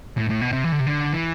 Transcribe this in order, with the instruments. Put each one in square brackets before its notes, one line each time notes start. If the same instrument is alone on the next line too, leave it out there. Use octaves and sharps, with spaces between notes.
[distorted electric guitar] A2
A2
B2
C3
E3
D3
C3
D3
E3